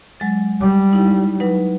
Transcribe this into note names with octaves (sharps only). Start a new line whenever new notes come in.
F#3 G#3 A6
G3 D6
D#4 E4
F#3 D#4 B4